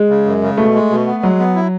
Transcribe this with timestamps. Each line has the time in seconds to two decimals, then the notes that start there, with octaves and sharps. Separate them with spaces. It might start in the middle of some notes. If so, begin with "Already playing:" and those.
Already playing: G#3
0.09 C#3
0.25 F#2
0.42 C#3
0.57 B2 A3
0.74 G#3
0.90 B2
1.07 B3
1.23 F#3 G#3
1.39 B3
1.55 E4